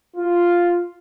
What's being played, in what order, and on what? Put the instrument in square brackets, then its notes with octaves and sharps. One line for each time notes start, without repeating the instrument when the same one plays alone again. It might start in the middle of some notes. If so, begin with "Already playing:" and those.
[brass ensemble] F4